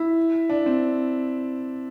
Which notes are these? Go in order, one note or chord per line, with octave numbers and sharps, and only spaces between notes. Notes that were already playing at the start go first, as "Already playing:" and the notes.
Already playing: E4
D4
C4